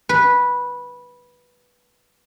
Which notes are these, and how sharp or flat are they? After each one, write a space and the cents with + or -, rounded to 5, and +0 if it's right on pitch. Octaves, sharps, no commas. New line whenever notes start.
B4 -10